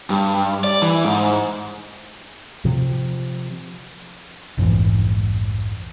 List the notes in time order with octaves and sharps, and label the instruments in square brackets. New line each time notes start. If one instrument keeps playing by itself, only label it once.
[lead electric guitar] G2
D5
E3
G#2
[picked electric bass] C3 F3
A#1 F2 G#2 E3